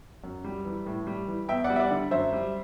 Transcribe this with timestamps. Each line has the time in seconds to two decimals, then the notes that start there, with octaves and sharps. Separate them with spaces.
0.24 F#2
0.44 G3
0.65 E3
0.86 A2
1.07 G3
1.27 E3
1.48 E2 E5 G5
1.64 D5 F#5
1.70 G3
1.76 E5
1.80 D5 F#5
1.91 D3
2.11 F#2 C5 E5
2.33 G3